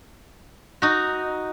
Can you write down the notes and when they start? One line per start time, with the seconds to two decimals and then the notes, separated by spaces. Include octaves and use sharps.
0.82 D#4 F#4